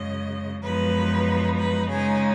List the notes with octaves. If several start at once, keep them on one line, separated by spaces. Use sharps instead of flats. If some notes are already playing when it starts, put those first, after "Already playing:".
Already playing: F#2 C#3 G#3 D#5
F#2 F3 G#3 B3 D#4 B4
B4
C#3 G#3 D#4 G#4